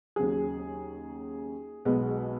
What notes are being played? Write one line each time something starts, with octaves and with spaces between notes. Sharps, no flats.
D#2 C#3 F#3 G#4
B1 B2 G#3 B3